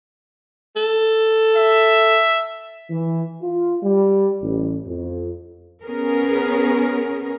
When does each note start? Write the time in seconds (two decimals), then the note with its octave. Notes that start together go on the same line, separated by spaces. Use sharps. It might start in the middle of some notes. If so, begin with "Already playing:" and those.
0.76 A4
1.56 E5
2.89 E3
3.42 F4
3.82 G3
4.42 A1
4.86 F2
5.83 B3 C#4 G#4 A#4